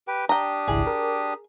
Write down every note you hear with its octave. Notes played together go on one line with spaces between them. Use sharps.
G4 B4 G5
D4 G4 G5 A#5 D#6
G#1 C#2 E4 G#4
A#4